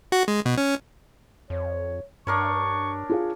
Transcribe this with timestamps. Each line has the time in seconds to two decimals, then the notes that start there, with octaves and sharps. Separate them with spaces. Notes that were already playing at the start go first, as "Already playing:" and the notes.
0.12 F#4
0.28 G#3
0.46 B2
0.58 C#4
1.50 F2 C#5
2.27 G2 D4 A#4 C#5 C#6
3.10 F4 G#4 F5